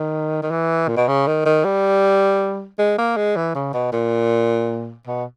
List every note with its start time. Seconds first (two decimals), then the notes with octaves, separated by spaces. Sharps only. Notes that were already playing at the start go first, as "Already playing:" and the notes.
Already playing: D#3
0.43 D#3
0.51 E3
0.88 A#2
0.97 B2
1.08 C#3
1.27 D#3
1.46 D#3
1.64 G3
2.79 G#3
2.98 A#3
3.17 G#3
3.36 E3
3.55 C#3
3.73 B2
3.93 A#2
5.07 B2